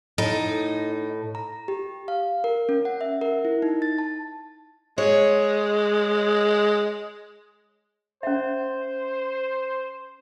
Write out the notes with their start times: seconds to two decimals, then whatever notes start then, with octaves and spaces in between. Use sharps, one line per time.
0.18 A2 D#4
1.35 A#5
1.68 G4
2.08 F5
2.44 A#4
2.69 C#4
2.85 F#5
3.01 E5
3.21 A#4
3.45 E4
3.62 D#4
3.82 A6
3.99 A5
4.98 G#3 C#5
8.23 C#4 C5 E5